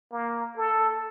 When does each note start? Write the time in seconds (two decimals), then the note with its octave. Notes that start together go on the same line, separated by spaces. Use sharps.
0.12 A#3
0.57 A4